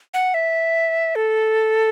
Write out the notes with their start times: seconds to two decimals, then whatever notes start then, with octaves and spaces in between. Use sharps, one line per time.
0.14 F#5
0.34 E5
1.15 A4